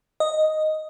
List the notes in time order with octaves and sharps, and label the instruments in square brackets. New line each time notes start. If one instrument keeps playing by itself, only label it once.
[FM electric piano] D#5